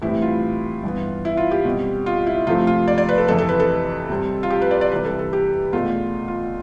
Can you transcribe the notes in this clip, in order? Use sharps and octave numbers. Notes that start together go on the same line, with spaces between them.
A2 E3 G3 C4 E4
F4
G2 E3 B3
E4
F4
G4
B2 G3 C4
F4
E4
C3 F3 A3 C4 F4
F4
D5
D5
B4
A4
F2 C3 E3 A4
A4
B4
A4
C3 G3 C4
F4
G4
B4
D5
D5
C3 E3 G3 B4
A4
A4
G4
E2 B2 A3 F4
F4